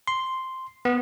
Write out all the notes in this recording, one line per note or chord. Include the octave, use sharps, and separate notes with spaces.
C6
B3